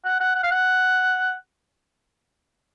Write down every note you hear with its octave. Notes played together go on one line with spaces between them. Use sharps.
F#5
F#5
F#5
F5
F#5